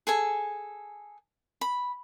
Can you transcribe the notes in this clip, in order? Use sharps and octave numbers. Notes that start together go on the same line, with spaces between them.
G#4 A4 G#5
B5